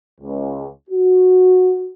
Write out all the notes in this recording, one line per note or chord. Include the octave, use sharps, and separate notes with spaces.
C#2
F#4